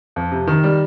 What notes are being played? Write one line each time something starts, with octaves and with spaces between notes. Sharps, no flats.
F2
C3
D#3
G3